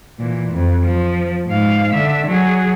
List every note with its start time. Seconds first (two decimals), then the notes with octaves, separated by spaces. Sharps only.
0.19 A#2 E3
0.54 F2
0.84 F3
1.47 G#2 F5
1.93 D3 E5
2.27 F#3 G#4